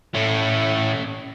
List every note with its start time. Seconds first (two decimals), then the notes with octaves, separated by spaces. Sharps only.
0.15 A2 A3 C#4 A4